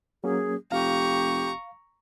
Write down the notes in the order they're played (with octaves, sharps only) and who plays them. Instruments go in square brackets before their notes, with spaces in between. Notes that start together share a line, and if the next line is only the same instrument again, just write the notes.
[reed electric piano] F#3 A#3 C#4 [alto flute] G#4
[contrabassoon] F1 [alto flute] G4 [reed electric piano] F5 [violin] A#5 C#6